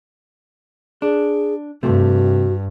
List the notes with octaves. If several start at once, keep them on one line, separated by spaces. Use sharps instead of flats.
D4 G#4
G2 C3 A3 F#4